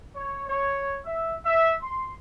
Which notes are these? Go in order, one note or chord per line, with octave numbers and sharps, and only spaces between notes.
C#5
C#5
E5
E5
C6